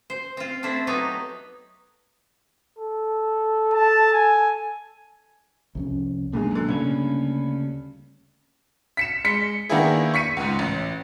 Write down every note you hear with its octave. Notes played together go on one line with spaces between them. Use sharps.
C5
C4 F4
A3 C4 D4 E4
F#3 B3 D#4 G4 B4
A4
A5
G#5
C2 F2 C#4
B1 E2 G#2 G#3 A#3 D4
F#2 D3
D2 G2 C#3 C#4
B6 C#7 E7
G#3 B6 C#7
D#3 A#3 B3 D4 E4 G#4
C#6 B6 C#7 D#7
C#2 G#2
A1